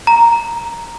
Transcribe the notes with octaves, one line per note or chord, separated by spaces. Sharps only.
A#5